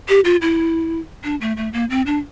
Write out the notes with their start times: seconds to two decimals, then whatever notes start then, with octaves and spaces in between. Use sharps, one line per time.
0.09 G4
0.25 F4
0.42 E4
1.24 D4
1.41 A3
1.57 A3
1.73 A#3
1.90 C4
2.06 D4